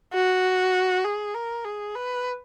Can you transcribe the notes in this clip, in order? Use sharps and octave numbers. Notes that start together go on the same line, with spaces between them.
F#4
G#4
A#4
G#4
B4